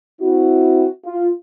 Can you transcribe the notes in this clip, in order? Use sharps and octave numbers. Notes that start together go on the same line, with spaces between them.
C4 E4 F#4
F4